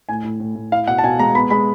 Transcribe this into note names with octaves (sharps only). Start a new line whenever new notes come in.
A2 G#5
A2
A2
A2
E4 F5
B2 F#5
A5
B2 G#5
G#3 A#5
B3 B5
G#3 B5